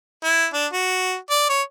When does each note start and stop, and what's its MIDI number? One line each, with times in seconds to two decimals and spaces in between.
0.24 0.46 64
0.54 0.66 62
0.73 1.15 66
1.30 1.45 74
1.49 1.62 73